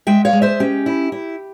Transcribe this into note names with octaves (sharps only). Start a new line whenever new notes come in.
G#3 E5 G5
C#5 F5
G#3
C5 E5
C#4 G4
E4
E4